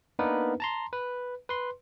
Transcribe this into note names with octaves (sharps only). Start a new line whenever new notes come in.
A#3 B3 D4 D#4 A#4 B4
A5 A#5 C6
B4
B4 C6